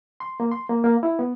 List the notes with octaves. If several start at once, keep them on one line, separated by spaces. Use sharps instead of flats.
C6
A#3
C6
A#3
A#3
E4
B3